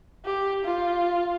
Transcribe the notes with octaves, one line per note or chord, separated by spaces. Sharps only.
G4
F4